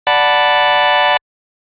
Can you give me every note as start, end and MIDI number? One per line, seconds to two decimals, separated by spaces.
0.07 1.17 74
0.07 1.17 78
0.07 1.17 81
0.07 1.17 83